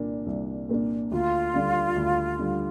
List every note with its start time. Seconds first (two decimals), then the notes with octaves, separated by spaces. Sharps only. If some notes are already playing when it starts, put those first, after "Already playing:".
Already playing: C2 A#2 A#3 D4
0.26 C2
0.69 A#2 A#3 D4
1.11 D2 F4
1.54 D3 G3 D4
1.96 D2
2.39 D3 G3 D4